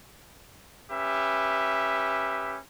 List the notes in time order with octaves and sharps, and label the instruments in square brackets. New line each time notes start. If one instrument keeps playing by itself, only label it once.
[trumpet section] C#4 G4 B4 E5